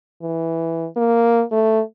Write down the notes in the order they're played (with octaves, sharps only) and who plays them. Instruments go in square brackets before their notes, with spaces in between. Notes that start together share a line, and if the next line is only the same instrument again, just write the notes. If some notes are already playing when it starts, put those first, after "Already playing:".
[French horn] E3
A#3
A3